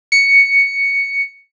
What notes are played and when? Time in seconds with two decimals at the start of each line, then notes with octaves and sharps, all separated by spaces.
0.12 C#7